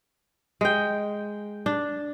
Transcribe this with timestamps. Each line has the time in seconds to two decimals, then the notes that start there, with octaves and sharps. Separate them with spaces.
0.61 G#3 G5
1.66 D4